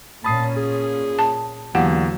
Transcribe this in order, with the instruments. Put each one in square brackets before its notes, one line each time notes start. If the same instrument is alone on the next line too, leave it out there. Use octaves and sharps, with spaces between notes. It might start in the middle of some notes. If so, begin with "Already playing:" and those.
[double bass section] A#2 C#4 [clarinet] A5 [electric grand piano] B5 D#6 C7
[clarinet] G#4
[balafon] A5
[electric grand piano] E2 G4 E7 [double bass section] D3 F#3 [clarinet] A#3 [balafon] F#5